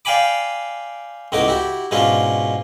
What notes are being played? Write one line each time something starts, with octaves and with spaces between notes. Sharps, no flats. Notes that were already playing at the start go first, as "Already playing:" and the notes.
D5 F5 G5 G#5 B5 D6
C#2 A2 B3 D#4 E4 D6
E4 F#4 G4
G#2 B2 C#4 D4 E4 F4